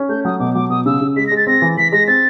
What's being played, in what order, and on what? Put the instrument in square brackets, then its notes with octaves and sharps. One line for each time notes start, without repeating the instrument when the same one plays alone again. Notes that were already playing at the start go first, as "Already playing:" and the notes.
Already playing: [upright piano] C#4
[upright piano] A3 [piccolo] G6
[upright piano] F#3 [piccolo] D#6
[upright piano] B2 [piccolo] D6
[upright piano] F#3 [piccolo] D6
[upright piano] B2 [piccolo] D#6
[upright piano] C#3 [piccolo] E6
[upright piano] C#3
[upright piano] G#3 [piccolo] B6
[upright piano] G#3 [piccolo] A#6
[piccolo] A6
[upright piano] C4 [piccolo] A#6
[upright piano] E3
[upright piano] E3 [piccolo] B6
[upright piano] G#3 [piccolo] A#6
[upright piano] C4 [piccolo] A6